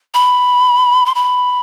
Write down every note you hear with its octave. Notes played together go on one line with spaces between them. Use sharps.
B5
C6
B5